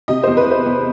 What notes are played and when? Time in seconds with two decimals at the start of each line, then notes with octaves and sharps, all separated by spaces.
0.08 C3 D#5
0.23 E2 C5
0.37 B4
0.47 E2 C5
0.66 E2